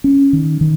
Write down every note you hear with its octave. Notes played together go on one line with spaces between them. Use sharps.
C#4
D#3
D#3